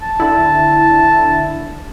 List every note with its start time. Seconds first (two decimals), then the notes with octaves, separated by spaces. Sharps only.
0.02 A5
0.20 D3 E4